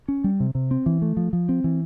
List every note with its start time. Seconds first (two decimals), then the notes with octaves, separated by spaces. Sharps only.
0.08 C#4
0.24 G3
0.40 C3
0.55 C3
0.71 C4
0.86 E3
1.02 A3
1.17 F3
1.33 F3
1.49 C4
1.64 E3